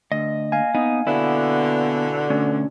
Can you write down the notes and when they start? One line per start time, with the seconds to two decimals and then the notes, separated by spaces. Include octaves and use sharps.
0.12 D2 D#5
0.52 A#3 F5 G#5
0.75 B3 D#4
1.07 B2 D3 B3 E4 B4
2.30 D2 C#4